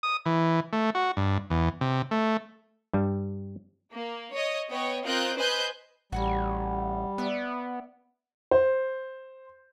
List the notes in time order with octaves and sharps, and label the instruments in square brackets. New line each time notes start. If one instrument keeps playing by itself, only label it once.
[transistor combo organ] D#6
E3
A3
F#4
G2
E2
C3
A3
[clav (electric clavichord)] G2 G3
[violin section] A#3
C#5 D#5
B3 C#5 D#5 G5
C4 F4 A#4 D#5 F#6 G6
B4 C5 D#5 G#5 F#6 G6
[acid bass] A1 [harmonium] G3 [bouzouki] F#4 F#5 G#5
[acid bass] B3 [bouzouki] D5 E5 F#5
[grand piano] C5